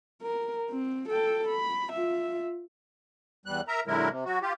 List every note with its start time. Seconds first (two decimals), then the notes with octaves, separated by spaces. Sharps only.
0.22 A#4
0.70 C4
1.09 A4 G5
1.48 B5
1.92 F4 E5
3.46 E2 G3 F#6
3.68 A#4 E5 A#5
3.87 A#2 D3 F#3 G#3 E4 A#4
4.10 C3
4.25 F#3 F#4
4.42 F4 G4